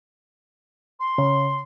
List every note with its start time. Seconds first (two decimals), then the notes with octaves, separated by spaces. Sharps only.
1.00 C6
1.18 C#3